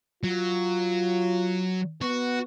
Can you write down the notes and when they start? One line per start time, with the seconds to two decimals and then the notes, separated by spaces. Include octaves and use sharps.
0.23 F#3 F4
2.02 B3 F#4